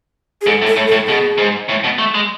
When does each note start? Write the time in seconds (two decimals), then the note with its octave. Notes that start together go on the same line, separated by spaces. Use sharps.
0.41 G#4
0.46 G#2 A4
0.62 A2
0.67 A4
0.76 A2
0.87 A4
0.92 A2
1.07 B2 G#4
1.38 G#2
1.69 A2
1.84 B2
1.99 A3
2.14 G#3